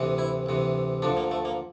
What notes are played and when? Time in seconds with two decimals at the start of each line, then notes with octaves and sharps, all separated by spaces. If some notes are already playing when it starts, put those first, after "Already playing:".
Already playing: D2 C3 E3
0.18 E4
0.46 D2 C3 E3
1.02 D2 D3 F3 D4
1.17 A#3
1.31 A3
1.45 A#3